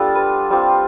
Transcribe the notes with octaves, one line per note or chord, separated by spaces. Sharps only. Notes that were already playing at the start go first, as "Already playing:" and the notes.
Already playing: G3 B3 D4 F4 A4
B4
G3 C4 F4